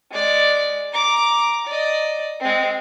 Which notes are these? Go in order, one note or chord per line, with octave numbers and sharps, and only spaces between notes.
G#3 D5
A#5 D6
D5 D#5
G#3 C4